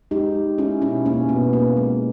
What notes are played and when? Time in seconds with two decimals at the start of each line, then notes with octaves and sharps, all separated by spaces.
0.11 G#3 D#4 G4
0.35 G#3
0.58 G#3 C#4 E4
0.82 B2 C#4 E4
1.06 B2 A#3 C#4
1.29 B2 B3
1.53 B2 A#3
1.77 G#3